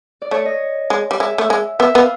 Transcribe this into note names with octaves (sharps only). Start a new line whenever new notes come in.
D5
A3 C#5
D#5
G#3
G3
G#3 E5
A3
G#3
B3 E5
B3 F5